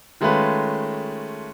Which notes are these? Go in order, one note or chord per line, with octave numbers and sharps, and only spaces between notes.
D#3 G#3 A3 C#4 F4 B4